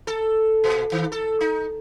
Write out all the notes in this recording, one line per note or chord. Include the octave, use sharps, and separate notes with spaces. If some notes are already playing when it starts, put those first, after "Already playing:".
A4
A#2
D#3
A4
D#4